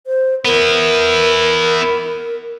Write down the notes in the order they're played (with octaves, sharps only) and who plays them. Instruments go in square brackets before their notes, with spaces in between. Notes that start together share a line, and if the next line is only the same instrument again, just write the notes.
[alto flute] C5
[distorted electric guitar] B3 E4 [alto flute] A#4